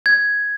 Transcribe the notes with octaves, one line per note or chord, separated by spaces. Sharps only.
G#6